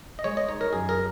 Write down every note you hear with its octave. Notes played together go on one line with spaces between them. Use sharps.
D#5
G#3 C#5
D#5
D#4 C#5
A#4
F#2 G#4
A#4